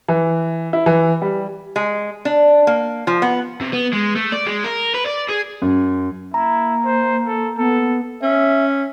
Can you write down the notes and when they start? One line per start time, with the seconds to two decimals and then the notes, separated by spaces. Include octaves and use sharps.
0.08 E3
0.73 E4
0.86 E3
1.22 G3
1.76 G#3
2.25 D4
2.67 A#3
3.07 F3
3.22 B3
3.61 C3
3.73 B3
3.93 G#3
4.16 A3
4.32 D5
4.46 G#3
4.64 A#4
4.94 B4
5.06 D5
5.29 G#4
5.62 F#2
6.34 A#3 E4 A#5
6.85 C5
7.27 A4
7.58 B3 A4
8.22 C#4 E5